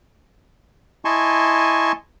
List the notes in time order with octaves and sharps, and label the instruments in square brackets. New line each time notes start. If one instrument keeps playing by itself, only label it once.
[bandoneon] E4 D#5 G#5 A5 C6 C#6